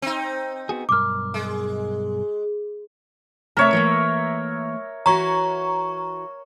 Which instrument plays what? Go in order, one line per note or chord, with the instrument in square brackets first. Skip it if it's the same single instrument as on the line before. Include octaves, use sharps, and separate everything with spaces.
[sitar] C4 D#4
[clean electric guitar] B3 F#4 G#4
[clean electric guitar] B1 G2 A#4 [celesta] D6 F6
[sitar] G#3
[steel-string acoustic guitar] C3 A3 A5 [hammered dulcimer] A#4 C#5 E5
[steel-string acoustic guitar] E3 A3 A#3
[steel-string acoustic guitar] E3 F#4 [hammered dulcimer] C#5 [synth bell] A#5 C#6